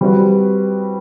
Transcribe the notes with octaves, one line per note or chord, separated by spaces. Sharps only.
G3 C4 F#4 B4